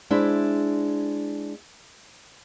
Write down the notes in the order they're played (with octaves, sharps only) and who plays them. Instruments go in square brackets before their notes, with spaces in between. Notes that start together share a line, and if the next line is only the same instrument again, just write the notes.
[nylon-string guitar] G#3 D4 E4 C5 E5